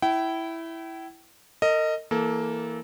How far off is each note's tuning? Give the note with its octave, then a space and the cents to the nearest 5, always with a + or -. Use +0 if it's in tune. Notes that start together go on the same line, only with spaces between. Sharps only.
E4 +0 G5 -35
A#4 -40 D#5 +0
E3 +5 A#3 +0 A4 -20